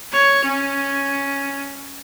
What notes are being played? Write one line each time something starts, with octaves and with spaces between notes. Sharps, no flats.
C#5
C#4